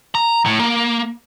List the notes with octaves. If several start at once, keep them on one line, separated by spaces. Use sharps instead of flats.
A#5
A2
A#3